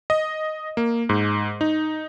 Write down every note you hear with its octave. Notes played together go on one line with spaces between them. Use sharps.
D#5
A#3
G#2
D#4